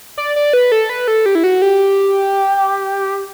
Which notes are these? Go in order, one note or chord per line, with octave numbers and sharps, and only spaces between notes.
D5
D5
B4
A4
B4
A4
G4
E4
F#4
G4